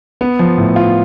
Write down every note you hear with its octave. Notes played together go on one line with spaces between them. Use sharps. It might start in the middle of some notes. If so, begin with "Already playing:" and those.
B3
F3
A2
F4